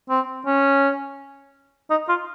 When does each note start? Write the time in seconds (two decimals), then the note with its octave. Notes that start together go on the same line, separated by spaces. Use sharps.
0.09 C4
0.46 C#4
1.90 D#4
2.09 F4